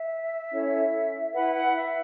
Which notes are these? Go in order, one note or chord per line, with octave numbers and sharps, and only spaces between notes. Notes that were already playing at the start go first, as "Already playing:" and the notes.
Already playing: E5
C#4 E4 A4 C#5
E4 B4 F#5
F#5
E5